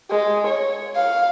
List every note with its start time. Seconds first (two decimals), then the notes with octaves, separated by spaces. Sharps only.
0.11 G#3
0.47 C#5
0.96 F5